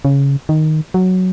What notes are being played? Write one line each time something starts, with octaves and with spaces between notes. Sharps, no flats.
C#3
D#3
F#3